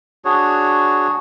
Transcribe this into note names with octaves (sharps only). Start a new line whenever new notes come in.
D4 F#4 G#4 C#5